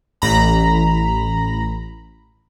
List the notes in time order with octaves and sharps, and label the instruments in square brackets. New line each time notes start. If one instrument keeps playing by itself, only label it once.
[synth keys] A1 A#5 B5